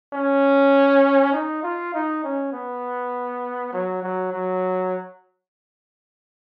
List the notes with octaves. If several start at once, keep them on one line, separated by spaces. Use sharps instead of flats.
C#4
D#4
F4
D#4
C#4
B3
F#3
F#3
F#3